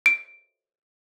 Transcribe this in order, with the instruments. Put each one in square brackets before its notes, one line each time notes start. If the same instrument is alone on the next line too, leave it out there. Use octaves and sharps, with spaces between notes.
[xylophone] D7